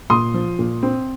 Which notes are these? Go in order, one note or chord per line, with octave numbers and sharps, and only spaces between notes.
A#2 C6 D#6
F3
A#2
C4